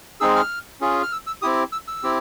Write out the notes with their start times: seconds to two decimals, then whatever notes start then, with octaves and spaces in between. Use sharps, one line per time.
0.21 G#3 C4 D#4 G#4 E6
0.36 F6
0.81 C#4 F4 G#4
1.03 F6
1.12 E6
1.27 E6
1.42 C4 E4 G4 D#6
1.72 E6
1.88 E6
2.03 C4 E4 G4